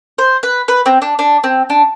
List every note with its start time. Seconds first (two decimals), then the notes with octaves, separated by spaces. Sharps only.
0.18 C5
0.43 B4
0.68 B4
0.86 C4
1.02 D4
1.19 D4
1.44 C4
1.70 D4